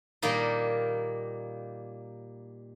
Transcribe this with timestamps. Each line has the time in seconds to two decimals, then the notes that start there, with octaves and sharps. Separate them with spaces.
0.22 A#2 D#3 G3 A#3 D#4 F4